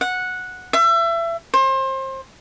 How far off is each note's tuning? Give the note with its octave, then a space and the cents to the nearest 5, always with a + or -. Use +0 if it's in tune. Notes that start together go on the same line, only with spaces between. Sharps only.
F#5 -10
E5 +30
C5 +30